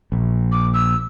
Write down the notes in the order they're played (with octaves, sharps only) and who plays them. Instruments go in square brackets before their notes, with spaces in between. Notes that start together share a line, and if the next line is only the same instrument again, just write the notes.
[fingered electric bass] A#1
[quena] D6
E6